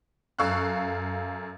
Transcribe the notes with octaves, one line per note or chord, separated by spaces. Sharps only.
F#2 A4 F5 C#6 E6 F#6